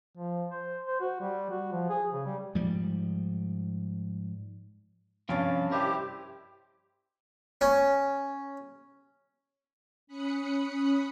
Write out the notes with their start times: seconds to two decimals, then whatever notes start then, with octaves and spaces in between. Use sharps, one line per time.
0.17 F3
0.52 C5
0.87 C5
1.00 F#4
1.21 G3
1.50 F#4
1.72 F3
1.89 G#4
2.13 C#3
2.26 G3
2.55 G#2 F3 G3
5.29 G2 C3 F3 C#4 F5 G5 A6
5.71 E4 G4 A#4 C5 D5 D#5
7.61 C#4
10.07 C#4 B5 D#6 F#6 C#7